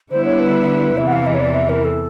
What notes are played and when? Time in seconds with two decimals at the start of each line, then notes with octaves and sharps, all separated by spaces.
0.11 D3 G3 B3 E4 C5
0.25 C#5
0.39 B4
0.98 E2 C3 E3 E5
1.07 F#5
1.12 F5
1.27 D#5
1.34 C#5
1.40 D5
1.55 E5
1.69 A#4
1.85 A4